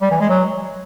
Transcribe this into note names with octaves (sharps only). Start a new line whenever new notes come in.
G3
E3
G#3
F#3